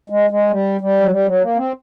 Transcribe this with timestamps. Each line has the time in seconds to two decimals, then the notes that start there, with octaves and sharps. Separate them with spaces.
0.10 G#3
0.30 G#3
0.51 G3
0.81 G3
1.00 F#3
1.11 G3
1.27 F#3
1.42 A#3
1.57 C4